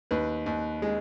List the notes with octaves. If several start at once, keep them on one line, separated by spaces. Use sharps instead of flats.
D#2 B4
D#2
G#3